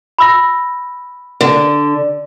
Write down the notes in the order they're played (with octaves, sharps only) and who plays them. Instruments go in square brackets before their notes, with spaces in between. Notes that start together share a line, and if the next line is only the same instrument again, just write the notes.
[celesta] B5 E6 A#6
[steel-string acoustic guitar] D3